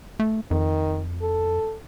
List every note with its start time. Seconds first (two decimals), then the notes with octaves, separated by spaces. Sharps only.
0.20 A3
0.51 F2 D#3
1.22 A4